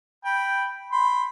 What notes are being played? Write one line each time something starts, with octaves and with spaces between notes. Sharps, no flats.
G5 B5
B5 C6